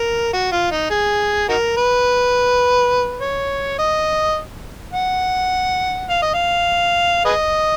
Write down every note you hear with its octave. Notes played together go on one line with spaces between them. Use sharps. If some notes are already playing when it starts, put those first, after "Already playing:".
Already playing: A#4
F#4
F4
D#4
G#4
D#4 F#4 A#4
B4
C#5
D#5
F#5
F5
D#5
F5
G#4 B4 D#5